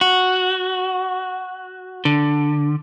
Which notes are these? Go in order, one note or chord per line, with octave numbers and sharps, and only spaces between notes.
F#4
D3